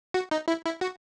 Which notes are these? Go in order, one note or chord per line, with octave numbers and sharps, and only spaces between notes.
F#4
D#4
E4
E4
F#4